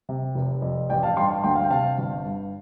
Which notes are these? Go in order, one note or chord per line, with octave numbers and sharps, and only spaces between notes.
C3
F1
F2
A1 D5 G5
F5 A5
G2 G5 C6
F5 A5
D2 G5 C6
F5
G5
C3 F5 A5
G1
G2